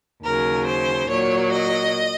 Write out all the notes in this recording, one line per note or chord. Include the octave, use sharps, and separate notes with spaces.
D#2 C#3 F#3 A#4
C5
A#2 F#3 C#5
D#5